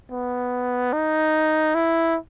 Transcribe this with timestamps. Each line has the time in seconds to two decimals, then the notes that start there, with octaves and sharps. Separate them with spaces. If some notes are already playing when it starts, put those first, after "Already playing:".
0.11 B3
0.93 D#4
1.75 E4